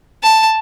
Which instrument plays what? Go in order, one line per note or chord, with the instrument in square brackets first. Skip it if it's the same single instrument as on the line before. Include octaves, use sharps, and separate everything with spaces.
[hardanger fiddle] A5